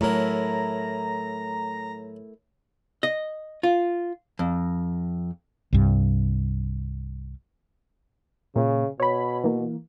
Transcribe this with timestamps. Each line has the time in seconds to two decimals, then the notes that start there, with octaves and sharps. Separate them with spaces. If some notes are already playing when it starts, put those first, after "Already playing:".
0.01 A2 F#3 A3 E4 A#4 A#5
3.03 D#5
3.63 F4
4.39 F2
5.73 C2 G2
8.56 A#2 C#3
9.00 B2 C#5 B5
9.44 E3 A#3